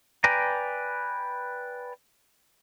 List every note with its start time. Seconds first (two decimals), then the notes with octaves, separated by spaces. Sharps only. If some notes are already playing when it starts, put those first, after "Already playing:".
0.24 B4 D5 G5 G#5 A#5